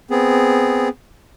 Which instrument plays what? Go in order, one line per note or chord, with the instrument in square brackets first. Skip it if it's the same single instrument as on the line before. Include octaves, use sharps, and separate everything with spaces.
[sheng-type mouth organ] B3 C4 G#4